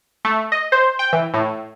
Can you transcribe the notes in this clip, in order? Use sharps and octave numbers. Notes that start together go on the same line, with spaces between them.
A3
D#5
C5
G5
E3
A2